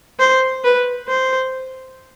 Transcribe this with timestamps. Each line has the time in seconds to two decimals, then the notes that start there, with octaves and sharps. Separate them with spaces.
0.19 C5
0.64 B4
1.09 C5